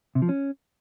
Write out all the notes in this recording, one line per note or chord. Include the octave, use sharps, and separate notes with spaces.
C3
F3
C#4